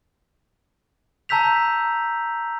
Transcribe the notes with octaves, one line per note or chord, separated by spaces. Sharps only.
A5 A#5 E6 G6 B6 F7